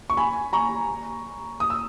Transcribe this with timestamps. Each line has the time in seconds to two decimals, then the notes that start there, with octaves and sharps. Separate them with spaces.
0.10 C#6
0.17 G#5 B5
0.53 A#5 C#6
1.60 D#6
1.70 E6